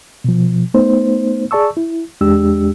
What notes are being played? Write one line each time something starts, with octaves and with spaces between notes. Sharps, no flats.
B2 F3
A3 B3 D#4 C5
G#4 D5 A5 C#6 E6
E4
E2 G#3 D4 G4 E6